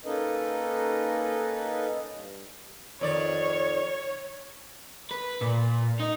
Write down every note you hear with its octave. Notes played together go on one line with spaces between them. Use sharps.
A#3 C#4 D#4 A4 B4 D#5
G2
F2 D#3 C#5 D5
B4
A#2
D#4